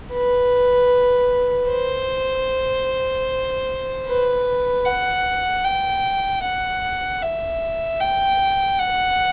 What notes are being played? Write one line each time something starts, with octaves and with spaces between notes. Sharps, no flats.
B4
C5
B4
F#5
G5
F#5
E5
G5
F#5